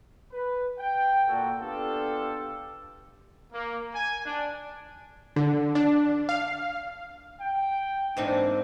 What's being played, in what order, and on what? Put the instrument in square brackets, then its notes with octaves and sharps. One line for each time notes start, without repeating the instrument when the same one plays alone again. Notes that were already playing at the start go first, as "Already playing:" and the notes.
[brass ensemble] B4
G5
A#2 F#4 A4
B3 D4 F4 G4 A4
[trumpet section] A#3
G#5
D4
[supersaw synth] D3
D4
F5
[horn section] G5
[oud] G#2 C4 D#4 [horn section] E3 A#3 D4